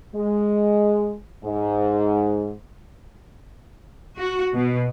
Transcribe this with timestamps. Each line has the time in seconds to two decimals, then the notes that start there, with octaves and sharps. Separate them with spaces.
0.15 G#3
1.45 G#2
4.17 F#4
4.54 B2